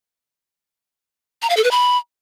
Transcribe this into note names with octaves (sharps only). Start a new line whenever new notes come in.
A#5
F5
A4
B4
B5